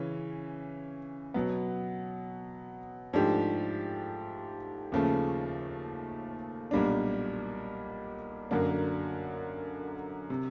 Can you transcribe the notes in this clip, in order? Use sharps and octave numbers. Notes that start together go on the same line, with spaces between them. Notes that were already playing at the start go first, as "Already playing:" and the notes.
Already playing: C#3 E3 C#4
B2 F#3 B3
G#2 F3 A3 D4 G4
D#2 C#3 F3 A3
B1 A#2 G3 A#3 D4
F#2 D3 F#3 A#3 D4
C3